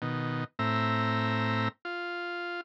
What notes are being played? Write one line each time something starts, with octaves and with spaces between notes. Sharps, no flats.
B2 D#3
A2 C4 E5 A#5
F4